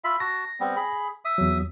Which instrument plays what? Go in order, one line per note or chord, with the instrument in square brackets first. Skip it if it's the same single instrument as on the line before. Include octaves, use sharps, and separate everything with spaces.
[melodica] F4 E5 B5
[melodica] F#4 A5 [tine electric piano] A#6
[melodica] G3 B3 C4
G#4 B5
E5 D#6
[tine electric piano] E2 F#3